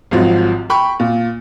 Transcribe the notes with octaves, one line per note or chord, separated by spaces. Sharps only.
G#1 G#2 F3 F#3
G5 B5 C#6
A#2